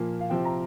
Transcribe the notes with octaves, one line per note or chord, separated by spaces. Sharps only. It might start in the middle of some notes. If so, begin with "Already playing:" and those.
Already playing: A#2 F3 A#3
F5
C3 F3 C4 G5
A#5